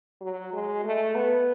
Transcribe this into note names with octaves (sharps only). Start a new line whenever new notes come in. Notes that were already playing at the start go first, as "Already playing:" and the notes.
F#3
G#3
A3
B3